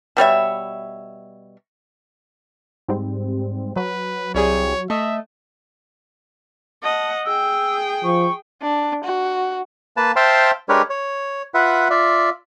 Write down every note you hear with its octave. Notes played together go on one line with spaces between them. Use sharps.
B2 G3 C#5 E5
G#2 G3 C4
F#3 B4
C2 G3 G#4 C#5
A3 D#5 E5
D#5 F#5 A5
G#4 G5 E6
F3 C#6
D4
F#4
A#3 B4 A5
C5 E5 F5 G5 A5 C6
G#3 D4 G4 A#4 B4 C#5
C#5
F4 B4 E5 F#5
F4 D5 E5